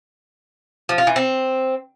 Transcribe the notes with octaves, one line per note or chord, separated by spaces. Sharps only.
F3
F4
E3
C4